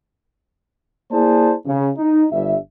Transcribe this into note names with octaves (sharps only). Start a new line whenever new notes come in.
A#3 E4 G#4 C5 D5 A5
C#3
D#4
G1 G2 E5